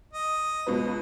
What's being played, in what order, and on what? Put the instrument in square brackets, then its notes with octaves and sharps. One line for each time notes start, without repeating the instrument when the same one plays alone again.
[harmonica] D#5
[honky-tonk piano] C#2 B2 B4